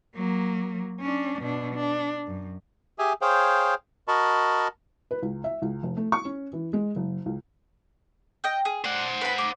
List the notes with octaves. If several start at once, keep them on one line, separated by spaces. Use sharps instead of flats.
F#3 A#3
C#4 D4
B2 D4
D4
F#2
G4 G#4 E5 G#5
G#4 C5 C#5 F5 G5
F#4 A#4 D#5 A5 B5 C#6
B4
C#2
E5
C#2
F1
A3
C#6
C#4
E3
G#3
F#1
C#2
D#5 G5
G#4
D4 C5 F#5
B4 B5
D6